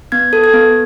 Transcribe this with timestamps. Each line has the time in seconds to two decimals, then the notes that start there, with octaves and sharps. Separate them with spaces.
0.12 B3 G#6
0.33 A4
0.44 G#6
0.53 B3